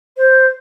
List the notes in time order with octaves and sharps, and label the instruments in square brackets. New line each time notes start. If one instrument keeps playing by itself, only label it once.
[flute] C5